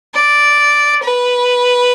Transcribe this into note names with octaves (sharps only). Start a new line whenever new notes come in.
D5
B4